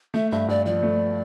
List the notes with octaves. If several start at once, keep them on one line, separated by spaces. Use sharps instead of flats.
A3 E5
G2 E5
G2 D5
F3 D5
A3